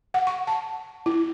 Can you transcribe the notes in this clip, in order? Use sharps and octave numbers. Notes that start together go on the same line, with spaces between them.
F#5
C#6
A5
E4